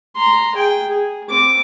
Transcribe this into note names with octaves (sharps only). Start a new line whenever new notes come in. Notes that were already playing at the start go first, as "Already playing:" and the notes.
A#5 C6
G#4 G5
G#4
C4 D6